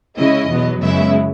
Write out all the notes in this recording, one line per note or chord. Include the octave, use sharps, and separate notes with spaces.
C#3 G#3 C#4 E4 D#5
E2 B2 F#3 B3
F#2 C#3 G#3 B3 E4 E5